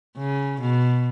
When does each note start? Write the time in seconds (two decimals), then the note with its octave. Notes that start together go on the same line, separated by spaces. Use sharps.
0.18 C#3
0.61 B2